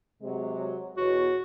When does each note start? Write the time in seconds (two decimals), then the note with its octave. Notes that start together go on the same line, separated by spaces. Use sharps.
0.22 C3 F#3 G#3
0.97 E2 B2 F#4 C#5